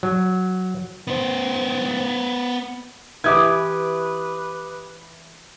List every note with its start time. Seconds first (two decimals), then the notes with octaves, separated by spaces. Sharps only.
0.03 F#3
1.07 B3 C5
3.24 E3 G4 B4 G5 D6 D#6 G#6